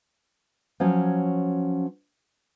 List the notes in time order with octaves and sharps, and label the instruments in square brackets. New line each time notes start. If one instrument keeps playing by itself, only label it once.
[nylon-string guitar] F3 F#3 C#4 C#5